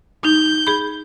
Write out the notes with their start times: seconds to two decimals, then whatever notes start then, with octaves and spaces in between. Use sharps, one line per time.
0.25 D#4 G6
0.67 G#4 B5